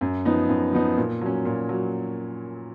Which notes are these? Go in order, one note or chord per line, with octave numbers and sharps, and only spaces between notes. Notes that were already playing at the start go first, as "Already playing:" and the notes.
F#2
F3 B3 D#4
F#2
F3 B3 D#4
A#2
F#3 C#4
A#2
F#3